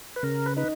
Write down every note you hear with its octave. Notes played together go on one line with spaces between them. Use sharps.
B4
C#3 A#4
B4
D#4 B4